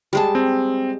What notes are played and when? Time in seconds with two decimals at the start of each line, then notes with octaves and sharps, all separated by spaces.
0.13 G3 G#3 A5
0.35 C4